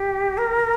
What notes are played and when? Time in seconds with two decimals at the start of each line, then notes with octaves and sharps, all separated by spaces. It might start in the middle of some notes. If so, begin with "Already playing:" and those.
Already playing: G4
0.38 A#4